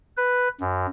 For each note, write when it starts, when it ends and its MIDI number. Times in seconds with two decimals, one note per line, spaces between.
0.17 0.48 71
0.61 0.87 42